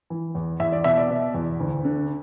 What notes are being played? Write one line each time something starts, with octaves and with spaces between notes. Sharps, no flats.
E3
E2
E2 E5
D5
B2 E5
D5
B2
E2
D2
D3